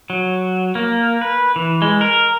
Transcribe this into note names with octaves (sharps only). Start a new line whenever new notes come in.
F#3
A#3
B4
E3
G#3
A#4